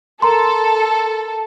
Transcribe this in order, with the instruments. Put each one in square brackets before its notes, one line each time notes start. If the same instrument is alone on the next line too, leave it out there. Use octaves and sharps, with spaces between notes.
[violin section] A4 [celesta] A#4 A#5 C6